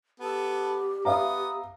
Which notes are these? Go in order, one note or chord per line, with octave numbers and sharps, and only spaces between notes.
B3 G4 A4
B3 E5 F5 A#5 D#6